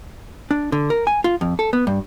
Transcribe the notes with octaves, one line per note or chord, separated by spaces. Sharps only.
D4
D3
A#4
G#5
F4
F2
A4
B3
G2